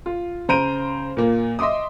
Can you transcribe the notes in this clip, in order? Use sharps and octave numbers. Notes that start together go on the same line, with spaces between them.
F4
C#3 C5 A#5 G6 D7 D#7
A#2 A#3
D#5 E5 C6 D6 D#6